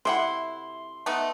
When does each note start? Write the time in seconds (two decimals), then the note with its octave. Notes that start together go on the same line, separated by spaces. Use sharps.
0.05 C3 E4 F#5 C6
1.06 A3 B3 D#4